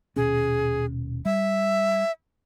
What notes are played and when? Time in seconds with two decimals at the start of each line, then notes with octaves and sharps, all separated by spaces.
0.16 D#1 B2 C#4 G#4
1.25 G3 E5